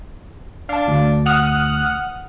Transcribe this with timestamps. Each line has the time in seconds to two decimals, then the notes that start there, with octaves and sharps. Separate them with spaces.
0.69 D4 F5 A5
0.88 D2
1.26 F#5 D#6 F6 F#6